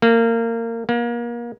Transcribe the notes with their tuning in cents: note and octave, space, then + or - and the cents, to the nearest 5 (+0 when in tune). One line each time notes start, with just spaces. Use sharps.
A#3 -25
A#3 +30